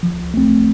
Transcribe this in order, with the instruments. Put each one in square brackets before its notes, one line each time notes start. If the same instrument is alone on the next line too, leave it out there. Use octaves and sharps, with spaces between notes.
[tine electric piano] F3
A3 C4